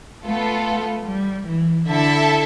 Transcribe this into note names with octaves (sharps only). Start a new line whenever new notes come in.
A3 B3 F4 A4
G3
E3
D3 E4 A4 E5 A5